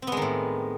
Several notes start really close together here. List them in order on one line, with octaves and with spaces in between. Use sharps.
C4 B3 G#3 D#3 A2